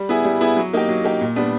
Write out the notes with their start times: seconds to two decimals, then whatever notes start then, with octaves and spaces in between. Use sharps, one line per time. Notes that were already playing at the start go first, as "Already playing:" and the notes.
Already playing: G3
0.09 B3 E4 G#4
0.25 G3
0.41 B3 E4 G#4
0.57 F#3
0.73 A#3 D#4 G4
0.89 F#3
1.04 A#3 D#4 G4
1.21 A#2
1.36 G3 B3 D4